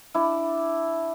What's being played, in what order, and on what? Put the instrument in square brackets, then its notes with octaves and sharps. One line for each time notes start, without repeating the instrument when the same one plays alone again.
[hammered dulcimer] D4 E4